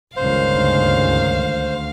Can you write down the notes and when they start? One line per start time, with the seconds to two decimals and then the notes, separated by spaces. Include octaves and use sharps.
0.16 G1 C#2 D#3 C5 F5
0.55 D2